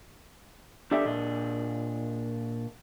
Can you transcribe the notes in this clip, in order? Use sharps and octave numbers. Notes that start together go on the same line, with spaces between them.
D4 G4 A4 D5 E5
A#2 D4 D#5